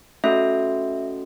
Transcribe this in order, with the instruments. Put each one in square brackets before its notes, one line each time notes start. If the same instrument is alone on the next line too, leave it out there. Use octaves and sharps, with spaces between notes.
[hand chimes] A3 C#4 F#4 A4 E5